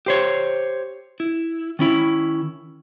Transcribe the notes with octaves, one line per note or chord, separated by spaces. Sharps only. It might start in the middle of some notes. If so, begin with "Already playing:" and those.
G4 C5 C#5
E4
D#3 C#4 E4